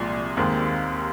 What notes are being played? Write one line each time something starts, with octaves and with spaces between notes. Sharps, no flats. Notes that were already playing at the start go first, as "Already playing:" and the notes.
Already playing: C2 A#2 F3 G#3
D#2 D#3 G#3 C4